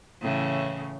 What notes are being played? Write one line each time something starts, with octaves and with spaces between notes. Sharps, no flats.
A2 C#3 E3